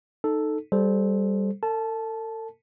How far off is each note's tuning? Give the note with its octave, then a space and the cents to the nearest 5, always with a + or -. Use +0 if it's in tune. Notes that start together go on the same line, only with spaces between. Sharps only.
D#4 -15 A4 +0
G3 +0 A4 -25 C5 +0
A4 +40 A5 -15